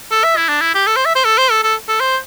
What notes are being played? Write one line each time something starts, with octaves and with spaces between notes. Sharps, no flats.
A4
E5
E4
D4
E4
G4
A4
C5
E5
C5
A4
C5
A4
A4
A4
C5